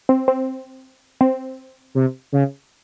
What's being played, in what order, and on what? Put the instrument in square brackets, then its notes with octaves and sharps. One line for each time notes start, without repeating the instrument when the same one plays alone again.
[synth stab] C4
C4
C4
[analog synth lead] C3
C#3